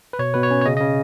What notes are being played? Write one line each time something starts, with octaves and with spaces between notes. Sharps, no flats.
B4
B2 C#5
B2 B4
C#5
C#4
C#5
C#3 D#5
D#5
C#3